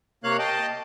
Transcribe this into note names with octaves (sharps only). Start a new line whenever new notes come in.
C3 A#3 C#5 F5 F#6
D#5 G5 A5